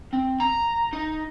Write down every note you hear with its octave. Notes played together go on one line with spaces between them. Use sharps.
C4
A#5
D#4